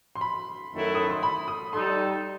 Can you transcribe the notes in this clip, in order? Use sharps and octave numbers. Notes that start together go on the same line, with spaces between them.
C6
B5
F#2 D#3 F#3 A3 E4
D#6
C6
B5
D#6
G3 D#4 A4 C6